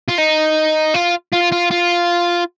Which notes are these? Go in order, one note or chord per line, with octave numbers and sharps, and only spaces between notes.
F4
D#4
F4
F4
F4
F4